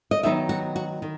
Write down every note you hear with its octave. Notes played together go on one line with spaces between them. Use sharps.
D#5
D#3 F#3 B3 D#4 E5
F#4
F#4
D#3